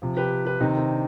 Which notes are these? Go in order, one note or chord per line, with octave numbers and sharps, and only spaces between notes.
C3 F3
G4 B4
G4 B4
C3 D#3 C4 D#4
C4
D4